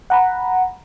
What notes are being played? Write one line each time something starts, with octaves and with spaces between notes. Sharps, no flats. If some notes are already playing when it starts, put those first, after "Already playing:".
F#5 A#5 B5